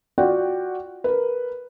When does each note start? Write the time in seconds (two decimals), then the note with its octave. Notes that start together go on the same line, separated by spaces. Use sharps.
0.18 F4 F#4 D5 F#5 G5
1.04 A#4 B4